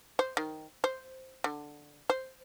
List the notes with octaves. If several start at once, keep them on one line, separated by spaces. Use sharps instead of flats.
C5
D#3
C5
D3
C5